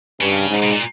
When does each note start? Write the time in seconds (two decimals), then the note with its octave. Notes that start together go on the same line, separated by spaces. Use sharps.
0.21 G2 C#3
0.49 G#2
0.63 B2
0.72 A#2